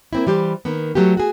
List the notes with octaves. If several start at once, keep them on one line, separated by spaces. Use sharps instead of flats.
A#3 C4 E4
E3 G3 G4 C5
D#3 A#3 B3
F#3 A3 B3 G4
F#4 G#4